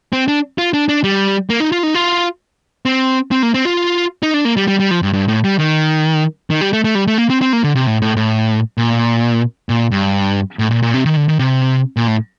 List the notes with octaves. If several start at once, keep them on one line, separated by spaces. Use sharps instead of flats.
C4
D4
F4
D4
D4
G3
A#3
D#4
F4
D#4
F4
C4
C4
A#3
C4
F4
D#4
D4
A#3
G3
G3
G3
F3
G2
G2
A2
G3
D#3
D#3
G3
A3
A3
G3
A3
A#3
C4
C4
A#3
D3
C3
A2
A2
A2
A#2
A#2
G2
A2
A#2
A#2
C3
D#3
D3
D#3
C3
A#2
A2